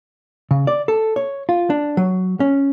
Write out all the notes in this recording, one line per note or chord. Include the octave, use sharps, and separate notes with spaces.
C#3
D5
A4
C#5
F4
D4
F#3
C#4